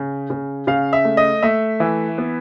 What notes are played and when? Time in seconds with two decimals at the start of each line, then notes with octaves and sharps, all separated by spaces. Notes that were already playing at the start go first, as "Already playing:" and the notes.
Already playing: C#3
0.30 C#3
0.67 C#3 F5
0.93 E5
1.05 A3
1.17 D#5
1.43 A3 E5
1.80 E3
2.18 B3